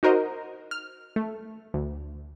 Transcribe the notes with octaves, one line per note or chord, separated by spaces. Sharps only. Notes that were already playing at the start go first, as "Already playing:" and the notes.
D#4 F#4 A#4 C5 D#5
F6
A3
D2